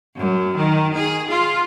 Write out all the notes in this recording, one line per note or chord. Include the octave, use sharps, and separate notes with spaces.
F#2
D#3
G#4
F4